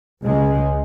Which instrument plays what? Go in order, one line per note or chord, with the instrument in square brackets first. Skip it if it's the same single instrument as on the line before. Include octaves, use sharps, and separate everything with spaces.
[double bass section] C#2 G#3